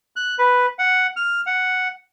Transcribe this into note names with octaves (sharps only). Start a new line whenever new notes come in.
F#6
B4
F#5
F6
F#5